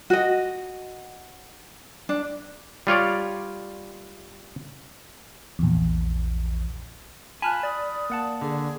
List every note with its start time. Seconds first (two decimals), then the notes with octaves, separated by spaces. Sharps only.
0.10 F#4 D#5
2.09 D4
2.87 G3 F4 C#5 D5
5.59 A#1 E2
7.42 F4 G#5 A5 B5 F6 F#6
7.63 D5 D#6
8.10 A#3 F#5 A5
8.42 D3 G#4